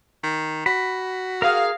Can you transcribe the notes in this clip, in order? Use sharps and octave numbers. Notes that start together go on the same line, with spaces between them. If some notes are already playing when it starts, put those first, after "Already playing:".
D#3
F#4 B5
G#4 A#4 F5